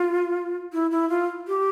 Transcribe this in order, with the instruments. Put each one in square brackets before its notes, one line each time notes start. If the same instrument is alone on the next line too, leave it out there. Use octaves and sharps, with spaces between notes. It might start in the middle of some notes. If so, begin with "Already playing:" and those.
Already playing: [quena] F4
E4
E4
F4
G4